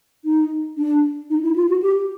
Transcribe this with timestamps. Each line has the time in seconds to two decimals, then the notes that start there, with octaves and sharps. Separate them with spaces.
0.25 D#4
0.77 D4
1.30 D#4
1.43 E4
1.56 F4
1.69 F#4
1.83 G4